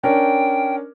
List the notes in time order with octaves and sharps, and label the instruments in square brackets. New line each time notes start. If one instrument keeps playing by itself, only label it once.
[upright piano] C#4 D4 A#4 [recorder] G5